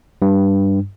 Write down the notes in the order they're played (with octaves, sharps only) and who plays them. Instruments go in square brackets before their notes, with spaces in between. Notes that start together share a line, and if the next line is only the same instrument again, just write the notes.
[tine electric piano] G2